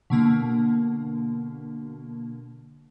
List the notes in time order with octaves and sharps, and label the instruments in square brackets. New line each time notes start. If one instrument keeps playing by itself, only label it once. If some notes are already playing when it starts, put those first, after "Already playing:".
[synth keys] B2 D3 A#3